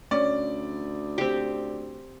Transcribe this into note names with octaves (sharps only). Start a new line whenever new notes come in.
D2 C#4 D5
C4 G4